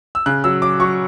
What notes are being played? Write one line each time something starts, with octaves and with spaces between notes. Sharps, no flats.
E6
C#3 F#6
F#3 E6
F#3 D6
F#3 C#6